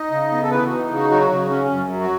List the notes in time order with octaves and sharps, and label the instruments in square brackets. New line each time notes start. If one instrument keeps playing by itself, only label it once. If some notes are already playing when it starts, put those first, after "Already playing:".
Already playing: [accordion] D#4 D#5
C#3
B3
A4
E3 B4
F#4
D#4
C#3 F#4
F#3 F#4
C#3
C#4
F#2
F#3
F#4